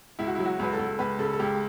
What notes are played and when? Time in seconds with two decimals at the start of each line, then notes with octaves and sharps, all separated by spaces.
0.19 C#2 E4
0.27 F#4
0.35 F#3 E4
0.46 F#4
0.60 C#2 B4
0.73 A4
0.79 C#2
0.99 C#2 B4
1.19 C#3 A4
1.33 A4
1.39 C#2 G4